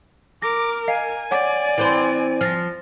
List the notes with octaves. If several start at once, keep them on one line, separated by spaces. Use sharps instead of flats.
A#4 D6 A#6
D#5 F5 G#5 C7
C#5 D5 F#5 D6
E3 C4 C5
F3 F6 A6 A#6